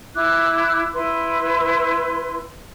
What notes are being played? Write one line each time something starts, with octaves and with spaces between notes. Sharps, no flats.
E4 D6 F#6
E4 B4 C6